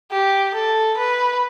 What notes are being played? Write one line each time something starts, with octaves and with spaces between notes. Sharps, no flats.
G4
A4
B4